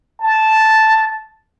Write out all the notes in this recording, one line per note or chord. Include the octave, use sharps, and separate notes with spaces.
A5